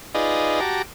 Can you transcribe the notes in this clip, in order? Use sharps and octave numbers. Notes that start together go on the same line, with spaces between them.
D#4 F4 G#4 B4 D5 D#5
F#4 G4 A5 A#5 D6